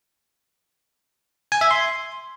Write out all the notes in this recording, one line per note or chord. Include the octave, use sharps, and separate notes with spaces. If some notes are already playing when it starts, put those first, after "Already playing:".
G#5
E5
C6